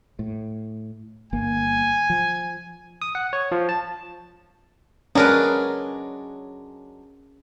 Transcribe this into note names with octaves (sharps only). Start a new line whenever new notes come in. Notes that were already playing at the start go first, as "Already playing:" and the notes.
A2
G1 A#3 G#5
F3
D#6
F#5
C#5
F3
A5
F#3 G#3 C#4 D4 G#4 A#4 B4